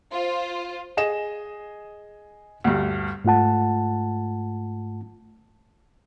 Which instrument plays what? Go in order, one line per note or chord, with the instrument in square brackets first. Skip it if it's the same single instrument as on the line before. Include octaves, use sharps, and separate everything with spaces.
[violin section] F4 C5
[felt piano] G#4 D#5 E7
D2 G2
[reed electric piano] G#2 A3 F4 F#5 A5